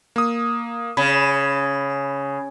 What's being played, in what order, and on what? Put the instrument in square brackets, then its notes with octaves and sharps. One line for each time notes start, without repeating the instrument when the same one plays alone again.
[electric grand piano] A#3 D#6
[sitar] C#3 [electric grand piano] B5